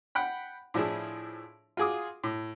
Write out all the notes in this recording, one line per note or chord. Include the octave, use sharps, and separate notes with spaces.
F#5 G5 B5
A2 F3 D4 E4 G#4
F4 F#4 G#4 D6 D#6
A2